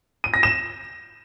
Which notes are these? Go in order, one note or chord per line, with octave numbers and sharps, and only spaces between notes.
D#7
A#6
E7